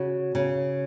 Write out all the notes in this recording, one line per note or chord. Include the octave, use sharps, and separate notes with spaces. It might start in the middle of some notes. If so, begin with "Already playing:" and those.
Already playing: C#3 F#4
C#3